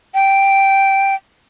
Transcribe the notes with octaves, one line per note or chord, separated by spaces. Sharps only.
G5